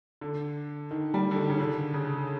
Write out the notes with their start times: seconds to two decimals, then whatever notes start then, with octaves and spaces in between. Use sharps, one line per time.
0.21 D3
0.91 D#3
1.14 G3
1.31 D3
1.36 D#3
1.50 C#3
1.60 D3
1.94 C#3